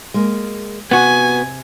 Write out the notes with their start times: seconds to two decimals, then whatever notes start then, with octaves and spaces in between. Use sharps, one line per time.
0.14 G#3 A#3
0.91 C3 B3 F#4 G#5